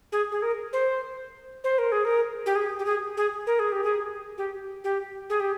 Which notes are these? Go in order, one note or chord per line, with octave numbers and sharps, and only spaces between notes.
G#4
G#4
A#4
C5
C5
A#4
G#4
A#4
G4
G#4
G4
G#4
G#4
A#4
G#4
G4
G#4
G4
G4
G#4
G4